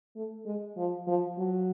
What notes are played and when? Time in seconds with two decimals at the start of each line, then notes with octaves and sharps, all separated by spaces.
0.16 A3
0.46 G#3
0.77 F3
1.07 F3
1.38 F#3